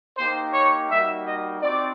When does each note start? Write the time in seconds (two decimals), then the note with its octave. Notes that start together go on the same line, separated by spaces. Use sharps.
0.17 A#3 D#4 G4 C5
0.53 C#5
0.89 G3 A#3 D#4 F#4 E5
1.25 D#5
1.61 C4 D#4 F#4 D5